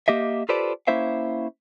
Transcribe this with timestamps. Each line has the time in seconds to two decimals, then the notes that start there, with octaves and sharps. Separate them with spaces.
0.08 A#3 G4 D#5 E5
0.49 F4 G4 A4 B4 C5 D5
0.87 A#3 C#4 E4 C5 E5 F5